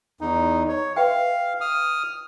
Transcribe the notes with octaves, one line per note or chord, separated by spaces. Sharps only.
E2 D#4
C#5
B4 E5 F5 G5
D#6 F6